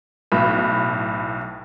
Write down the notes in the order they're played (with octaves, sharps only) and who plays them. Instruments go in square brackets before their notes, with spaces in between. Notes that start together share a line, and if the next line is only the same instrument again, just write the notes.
[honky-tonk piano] B1 A2 B5